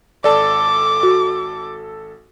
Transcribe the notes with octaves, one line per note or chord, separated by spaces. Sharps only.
G#1 A4 D5 A5 D6
F#4